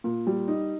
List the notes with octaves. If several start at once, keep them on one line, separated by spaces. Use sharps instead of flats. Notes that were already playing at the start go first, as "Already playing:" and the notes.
A#2
G3
D#4